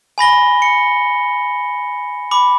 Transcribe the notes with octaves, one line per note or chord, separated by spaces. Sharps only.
G#5 B5 A#6 G7
C#7
B5 D6